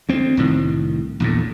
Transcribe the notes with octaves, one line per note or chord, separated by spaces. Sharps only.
D2 C4
C2 A2 D#3
A#1 E2 A2